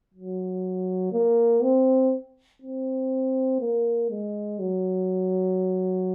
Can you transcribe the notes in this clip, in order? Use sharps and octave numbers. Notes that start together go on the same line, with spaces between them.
F#3
A#3
C4
C4
A#3
G#3
F#3